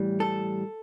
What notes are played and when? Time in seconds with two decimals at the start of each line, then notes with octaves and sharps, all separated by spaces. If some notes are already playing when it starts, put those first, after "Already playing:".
Already playing: A2 E3 G3
0.20 A4